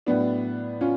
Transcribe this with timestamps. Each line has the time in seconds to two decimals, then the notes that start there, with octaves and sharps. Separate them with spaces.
0.06 A2 F#3 B3 D4
0.81 C#4 F4